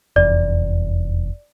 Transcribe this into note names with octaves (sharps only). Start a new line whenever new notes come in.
F1 E2 D5